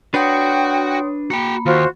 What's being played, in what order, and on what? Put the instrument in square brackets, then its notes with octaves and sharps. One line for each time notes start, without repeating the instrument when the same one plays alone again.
[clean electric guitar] D4 B4 [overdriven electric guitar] F#4 F#5 [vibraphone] C#5 C6 D#6 [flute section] G5
[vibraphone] A#3 B5 [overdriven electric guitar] F#4 G5
[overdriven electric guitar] D#2 [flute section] F4 F#4 C5